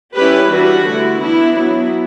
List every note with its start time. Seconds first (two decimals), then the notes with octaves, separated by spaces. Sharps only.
0.16 G3 C#4 E4 G4 B4
0.51 E3 G3 D4 F#4
0.86 D3 A3 E4
1.20 E3 B3 D4 E4
1.55 F#3 B3 E4